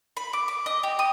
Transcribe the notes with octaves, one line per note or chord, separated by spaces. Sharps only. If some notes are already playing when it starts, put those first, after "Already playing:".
B5
D6
D6
D#5
G4
D#6